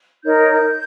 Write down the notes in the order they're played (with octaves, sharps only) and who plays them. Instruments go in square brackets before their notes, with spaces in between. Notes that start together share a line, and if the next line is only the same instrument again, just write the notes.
[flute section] D#4 A#4 C#5 G6